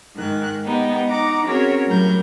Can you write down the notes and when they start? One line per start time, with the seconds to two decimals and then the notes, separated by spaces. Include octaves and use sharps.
0.15 G#2 D#3 F#6
0.63 G#3 B3 D#4 G4
1.08 D#4 F#5 A#5 D6
1.46 C4 C#4 F#4 G#4 A#4 C#5
1.87 A2 F#3 G3 A#4 G6